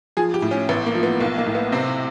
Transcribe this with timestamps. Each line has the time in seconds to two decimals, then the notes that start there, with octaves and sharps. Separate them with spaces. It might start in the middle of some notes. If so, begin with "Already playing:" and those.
0.17 F3 G#4
0.34 G4
0.42 A2
0.51 C#4
0.69 A1 B3
0.86 A#3
0.95 F3
1.03 B3
1.20 B1 A#3
1.38 A#3
1.46 A2
1.55 B3
1.72 C3 C4